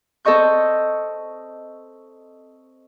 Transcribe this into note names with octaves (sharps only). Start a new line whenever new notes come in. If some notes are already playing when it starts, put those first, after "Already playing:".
C4 A4 C5 D#5 C#6 G6